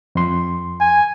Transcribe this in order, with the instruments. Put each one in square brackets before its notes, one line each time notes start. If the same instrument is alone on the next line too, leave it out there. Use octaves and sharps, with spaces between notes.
[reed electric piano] F2 C6
[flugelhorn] G#5